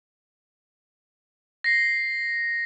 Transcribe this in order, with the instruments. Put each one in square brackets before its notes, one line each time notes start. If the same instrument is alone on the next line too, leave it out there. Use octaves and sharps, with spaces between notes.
[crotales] A#6 C7